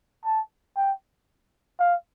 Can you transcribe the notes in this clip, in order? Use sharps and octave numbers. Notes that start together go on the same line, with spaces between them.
A5
G5
F5